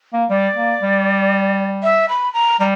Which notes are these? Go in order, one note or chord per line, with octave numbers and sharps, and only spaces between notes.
A#3
G3 D5
A#3
G3
E5
B5
A#5
G3 A#5